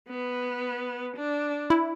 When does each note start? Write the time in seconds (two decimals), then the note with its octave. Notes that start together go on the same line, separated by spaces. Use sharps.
0.08 B3
1.17 D4
1.70 E4